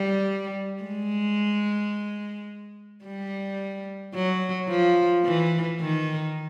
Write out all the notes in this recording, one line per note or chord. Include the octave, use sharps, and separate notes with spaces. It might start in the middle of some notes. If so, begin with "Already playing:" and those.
Already playing: G3
G#3
G3
F#3
F3
E3
D#3